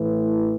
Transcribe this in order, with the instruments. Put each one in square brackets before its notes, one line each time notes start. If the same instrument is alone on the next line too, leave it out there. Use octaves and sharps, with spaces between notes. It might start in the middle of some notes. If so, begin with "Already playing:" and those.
Already playing: [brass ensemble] A2 E3